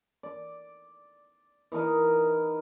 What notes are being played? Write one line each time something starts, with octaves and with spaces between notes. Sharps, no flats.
D5
E3 D#4 A#4 D#5